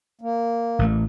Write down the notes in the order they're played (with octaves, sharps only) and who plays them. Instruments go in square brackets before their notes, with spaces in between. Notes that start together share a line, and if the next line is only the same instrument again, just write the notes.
[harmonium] A#3
[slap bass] A1 A3